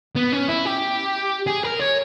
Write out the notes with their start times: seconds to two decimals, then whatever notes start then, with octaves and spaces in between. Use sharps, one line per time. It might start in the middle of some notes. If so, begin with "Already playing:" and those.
0.16 B3
0.33 C#4
0.49 E4
0.66 G4
1.47 G#4
1.64 A#4
1.80 C#5